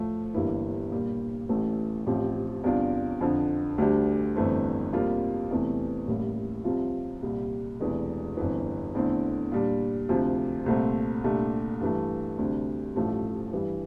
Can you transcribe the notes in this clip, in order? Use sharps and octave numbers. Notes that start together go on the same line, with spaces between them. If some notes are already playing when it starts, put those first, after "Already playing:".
Already playing: A2 F3 A3
G1 G2 E3 A#3 E4
A#2 G3 A#3
A1 A2 E3 A3
A1 A2 F3 C4 G4
E2 C3 G3 D4 F4
F2 D3 F3
D2 D3 G3 D4 G4
G1 F2 E3 A3 C4
F2 C3 G3 A#3 F4
E2 C3 E3 A3
A1 A2 G3 A#3
C2 C3 F3 C4 F4
C2 A#2 G3
E1 E2 C3 E3 A3
G1 F2 E3
E2 D3 A3 C4 E4
A#2 G3 D4
D2 C3 F3
C2 A#2 A3 C4
C2 A#2 A3 D4 G4
G2 E3 A3
D2 C3 G3 D4
A1 G2 F3 A3 E4
G2 E3 G3